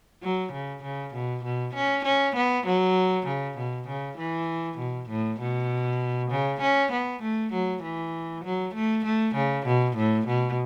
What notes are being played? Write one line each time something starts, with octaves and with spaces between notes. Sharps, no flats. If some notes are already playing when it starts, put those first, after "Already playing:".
F#3
C#3
C#3
B2
B2
C#4
C#4
B3
F#3
C#3
B2
C#3
E3
B2
A2
B2
C#3
C#4
B3
A3
F#3
E3
F#3
A3
A3
C#3
B2
A2
B2